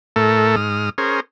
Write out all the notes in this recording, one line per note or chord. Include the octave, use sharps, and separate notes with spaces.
A2 A3 A4 A#4
G#2 D#6 F6
C#4 G#4 A#4 C5